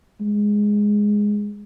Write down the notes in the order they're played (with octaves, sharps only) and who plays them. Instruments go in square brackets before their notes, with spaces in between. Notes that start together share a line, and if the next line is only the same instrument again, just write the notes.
[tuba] G#3